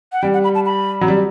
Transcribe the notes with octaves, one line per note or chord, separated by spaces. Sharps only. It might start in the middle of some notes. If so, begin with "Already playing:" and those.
F#5
G3 G5
F#5
B5
A5
B5
F#3
G3